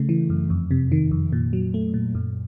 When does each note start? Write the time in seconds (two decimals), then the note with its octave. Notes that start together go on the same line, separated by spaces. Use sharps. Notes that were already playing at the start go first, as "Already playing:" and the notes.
Already playing: C#3 A3
0.09 E3
0.30 F#2
0.50 F2
0.71 C3
0.92 D#3
1.11 F2
1.32 A#2
1.53 F#3
1.74 A3
1.94 A#2
2.15 F#2